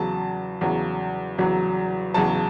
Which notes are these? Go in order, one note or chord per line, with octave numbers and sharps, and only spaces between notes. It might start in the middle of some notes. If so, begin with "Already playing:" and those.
Already playing: E2 C#3 F#3 A5
E2 C#3 F#3
E2 C#3 F#3
E2 C#3 F#3 A5